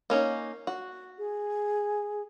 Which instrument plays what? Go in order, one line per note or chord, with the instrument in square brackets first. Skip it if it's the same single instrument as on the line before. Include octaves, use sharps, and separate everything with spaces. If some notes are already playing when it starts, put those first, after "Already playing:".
[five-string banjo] A#3 C#4 D#4
F#4
[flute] G#4